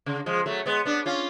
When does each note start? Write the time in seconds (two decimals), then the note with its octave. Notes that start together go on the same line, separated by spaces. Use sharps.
0.06 C#3
0.26 F3 G#3
0.46 F#3 A3
0.66 G#3 B3
0.85 B3 D4
1.06 C#4 F4